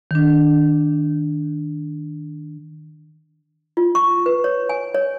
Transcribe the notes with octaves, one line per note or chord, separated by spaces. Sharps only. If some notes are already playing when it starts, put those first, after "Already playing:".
D#3 D4
F4
C#6
B4
C#5
G#5
C#5